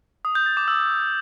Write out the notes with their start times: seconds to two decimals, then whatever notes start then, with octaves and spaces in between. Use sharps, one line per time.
0.25 D#6
0.35 G6
0.46 A6
0.57 D6
0.68 E6